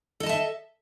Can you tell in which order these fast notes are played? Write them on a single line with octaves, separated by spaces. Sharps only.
A4 D#5 A5 E5